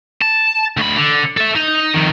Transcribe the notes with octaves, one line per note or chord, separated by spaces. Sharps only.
A5
D2 B5
D3
A4 E5
D#4
F2 D#3